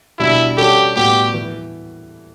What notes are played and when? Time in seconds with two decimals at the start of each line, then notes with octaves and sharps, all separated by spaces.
0.19 B2 G3 D4 E4
0.57 G3 C#4 F#4 G4 A4
0.96 A2 G3 B3 F#4 G4
1.34 E3